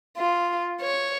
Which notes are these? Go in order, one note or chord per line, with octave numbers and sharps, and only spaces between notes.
F4
C#5